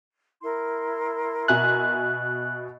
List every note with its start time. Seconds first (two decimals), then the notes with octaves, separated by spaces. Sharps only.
0.41 E4 A#4 C6
1.48 B2 E5 G#5 F#6